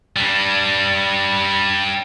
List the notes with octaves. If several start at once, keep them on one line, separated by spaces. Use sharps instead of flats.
G3 D4